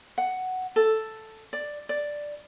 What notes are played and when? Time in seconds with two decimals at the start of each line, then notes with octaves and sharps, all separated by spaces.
0.18 F#5
0.76 A4
1.53 D5
1.89 D5